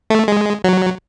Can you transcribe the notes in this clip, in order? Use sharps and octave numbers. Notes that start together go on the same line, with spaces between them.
A3
G#3
F#3